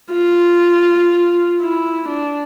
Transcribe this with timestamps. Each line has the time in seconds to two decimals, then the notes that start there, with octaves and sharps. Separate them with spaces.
0.13 F4
1.60 E4
2.09 D4